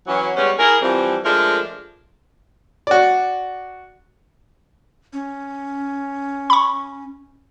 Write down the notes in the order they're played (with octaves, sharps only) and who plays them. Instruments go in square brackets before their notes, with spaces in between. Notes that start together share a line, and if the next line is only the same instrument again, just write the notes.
[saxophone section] E3 F#3 C#4
G3 G#3 B3 C#4
E4 G#4 A#4
E3 F3 G3 C4
F3 G#3 A3 D4 A4 A#4
[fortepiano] F#4 D5
[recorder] C#4
[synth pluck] B5 C#6